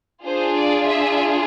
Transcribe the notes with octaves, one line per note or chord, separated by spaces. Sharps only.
D4 F4 G#4 C5
D5
E5